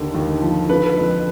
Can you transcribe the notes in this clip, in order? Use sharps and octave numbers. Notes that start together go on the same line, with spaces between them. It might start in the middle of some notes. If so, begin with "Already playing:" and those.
Already playing: D#2 D3
D#2
F3
D3 B4
F2